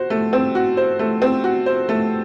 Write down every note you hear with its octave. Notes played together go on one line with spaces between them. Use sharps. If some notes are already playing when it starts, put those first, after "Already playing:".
Already playing: F#4 C5
A3
C4
F#4
C5
A3
C4
F#4
C5
A3